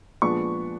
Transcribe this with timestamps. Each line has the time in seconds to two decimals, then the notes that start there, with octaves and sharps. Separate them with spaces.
0.22 A#2 F3 G#3 B3 D4 C#6